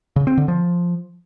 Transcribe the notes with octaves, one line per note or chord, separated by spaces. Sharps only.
C#3
C4
D3
F3